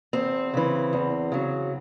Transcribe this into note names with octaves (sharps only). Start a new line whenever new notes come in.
E2 C4
C#3 E3
E2
C#3 F#3